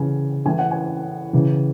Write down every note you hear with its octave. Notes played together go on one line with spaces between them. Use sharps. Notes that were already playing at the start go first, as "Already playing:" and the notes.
Already playing: C#3 E3 G#5
A2 E3 G#5
F#5
G#5
C#3 E3